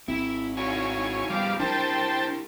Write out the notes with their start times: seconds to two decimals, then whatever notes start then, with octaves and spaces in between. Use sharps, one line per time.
0.08 G#1 C4 E4
0.57 D#4 E4 F#4 C#5 G#5
1.30 F3 G3 B3 F5 D6
1.60 D4 E4 G4 A#4 C5 G5 A5